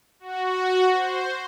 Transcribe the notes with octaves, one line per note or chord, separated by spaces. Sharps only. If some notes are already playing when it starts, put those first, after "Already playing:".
F#4
C5